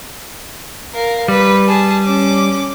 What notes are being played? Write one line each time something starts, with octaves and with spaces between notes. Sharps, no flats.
A#4 F5
G3 B4
G#4 A5
C#4 D6